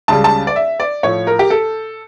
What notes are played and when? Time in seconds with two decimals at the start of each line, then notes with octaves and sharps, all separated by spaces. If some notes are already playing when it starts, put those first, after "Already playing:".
0.08 C#2 C#3 G3 A5
0.24 A5
0.47 D5
0.56 E5
0.80 D5
1.03 A2 F3 C#5
1.27 A#4
1.39 G4
1.50 A4